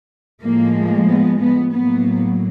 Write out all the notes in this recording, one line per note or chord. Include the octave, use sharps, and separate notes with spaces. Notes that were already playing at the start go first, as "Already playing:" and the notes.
A2 F3 G#3 A#3
B3
B3
A2 F#3 A#3 B3